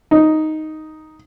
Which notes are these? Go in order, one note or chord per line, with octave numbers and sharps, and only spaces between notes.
D#4